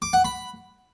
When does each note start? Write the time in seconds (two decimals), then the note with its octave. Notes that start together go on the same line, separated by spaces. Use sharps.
0.02 D6
0.13 F#5
0.25 B5